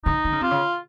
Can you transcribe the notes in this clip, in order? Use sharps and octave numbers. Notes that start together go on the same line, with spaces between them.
C#3 D#4
D#3
C#3
C3 F4
C#3